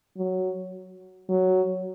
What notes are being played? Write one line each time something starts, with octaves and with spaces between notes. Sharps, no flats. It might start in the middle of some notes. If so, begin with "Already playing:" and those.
F#3
F#3